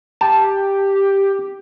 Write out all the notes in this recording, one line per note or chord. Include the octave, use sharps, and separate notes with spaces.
G4 A5